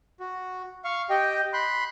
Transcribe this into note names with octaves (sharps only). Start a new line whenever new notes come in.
F#4
F5 C#6
G4 D#5 G5
B5 C6 F#6